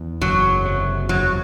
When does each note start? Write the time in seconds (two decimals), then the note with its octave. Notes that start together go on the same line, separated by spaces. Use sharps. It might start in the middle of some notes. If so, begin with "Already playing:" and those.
Already playing: E2
0.21 F#1 F#3
0.65 C3
1.09 E2 F#3